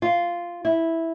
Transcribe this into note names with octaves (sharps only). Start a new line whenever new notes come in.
F4
E4